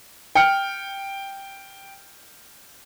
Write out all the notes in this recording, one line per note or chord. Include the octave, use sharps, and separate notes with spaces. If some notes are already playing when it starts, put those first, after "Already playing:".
G5 F6 C#7